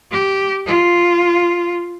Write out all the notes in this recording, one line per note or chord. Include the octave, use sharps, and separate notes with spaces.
G4
F4